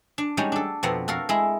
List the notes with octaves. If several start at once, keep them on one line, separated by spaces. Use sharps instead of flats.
D4
G3 G#3 C#4 D#4 F#4
D4 A4
F2 B2 B3 C4 F#5 A#5
F#4 A4 A#4 F5
G#3 E4 G#4